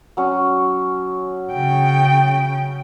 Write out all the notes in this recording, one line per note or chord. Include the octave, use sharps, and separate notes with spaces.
F#3 C#4
C#3 G5